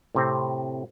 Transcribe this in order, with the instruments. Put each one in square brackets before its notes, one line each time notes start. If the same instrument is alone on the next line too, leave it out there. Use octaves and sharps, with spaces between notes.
[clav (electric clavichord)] A2 C3 C4